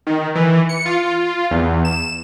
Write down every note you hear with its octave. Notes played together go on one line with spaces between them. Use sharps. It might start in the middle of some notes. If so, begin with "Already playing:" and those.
D#3
E3
C#7
F4
E2
E7